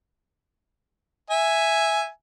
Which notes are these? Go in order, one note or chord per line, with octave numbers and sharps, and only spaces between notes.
E5 G#5